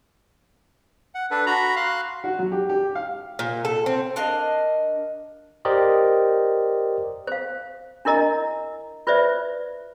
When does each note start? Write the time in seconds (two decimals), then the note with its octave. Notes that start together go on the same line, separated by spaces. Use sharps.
1.15 F#5
1.31 D4 A4 B4
1.46 F#4 A#5 B5
1.76 F5 C6 F#6
2.24 F#4
2.39 F#3
2.52 G4
2.69 G4
2.95 F5
3.39 A#2
3.65 A4
3.86 C4
4.16 D4 A#4 D#5 F5
5.65 G4 A#4 C5 D5 D#5
7.27 C5 F5
8.05 D4 E4 A#4 D#5 A#5
9.07 F4 B4 C5 D5 E5